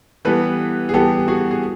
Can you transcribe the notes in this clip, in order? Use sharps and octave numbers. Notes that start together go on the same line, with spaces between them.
E3 G3 B3 A4 B4
G#4
E3 G3 B3 G4 A4
F#4 G#4
G#4